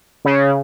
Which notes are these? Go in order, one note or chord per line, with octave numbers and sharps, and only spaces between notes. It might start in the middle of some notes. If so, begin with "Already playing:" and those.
C#3